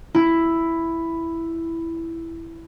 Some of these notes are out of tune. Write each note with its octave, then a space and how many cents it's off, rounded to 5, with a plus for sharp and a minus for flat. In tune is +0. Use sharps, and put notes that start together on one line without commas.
E4 +5